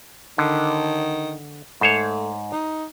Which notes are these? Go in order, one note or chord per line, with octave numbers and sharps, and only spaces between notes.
D3 D#3
G#2 A3 C5 C#5
D#4